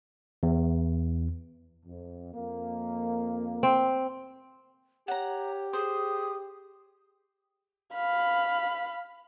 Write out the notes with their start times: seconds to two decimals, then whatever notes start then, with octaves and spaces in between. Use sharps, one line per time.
0.43 E2
1.86 F2
2.34 F2 A#3
3.63 C4
5.08 G4 C#5 F#5 A#5
5.73 G#4 C5 D#6
7.95 F5 B5